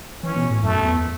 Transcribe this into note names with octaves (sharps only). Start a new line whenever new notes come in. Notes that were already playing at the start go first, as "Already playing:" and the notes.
E3 C#4
B2
A2
F#2 A3
E2